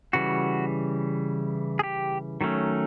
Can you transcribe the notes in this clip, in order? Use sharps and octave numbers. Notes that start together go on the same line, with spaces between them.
C#3 E3 G3 F#4
G#4
G4
D#3 F#3 A3 C#4